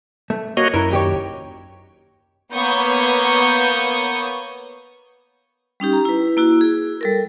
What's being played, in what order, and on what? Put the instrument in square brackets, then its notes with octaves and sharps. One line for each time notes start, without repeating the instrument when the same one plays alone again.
[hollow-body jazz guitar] A3
[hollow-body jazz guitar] A#3 [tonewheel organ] F#4 C#5 D#5
[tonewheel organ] F#2 [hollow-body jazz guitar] E4 A#4
[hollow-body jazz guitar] D#2 G4 C#5
[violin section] A#3 B3 C#5 C#6 D#6 G6
[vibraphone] G3 C#4 D#4 G4
A#5
E4 B4
A#3 E4 F#4
G#4
G3 A4 A#4